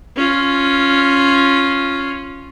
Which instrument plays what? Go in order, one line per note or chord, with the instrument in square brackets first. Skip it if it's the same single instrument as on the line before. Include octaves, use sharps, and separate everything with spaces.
[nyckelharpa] C#4 F4